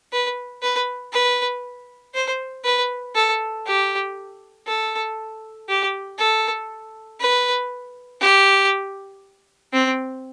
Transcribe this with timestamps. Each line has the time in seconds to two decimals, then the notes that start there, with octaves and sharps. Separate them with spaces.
0.12 B4
0.62 B4
1.13 B4
2.14 C5
2.65 B4
3.15 A4
3.66 G4
4.67 A4
5.69 G4
6.19 A4
7.20 B4
8.21 G4
9.73 C4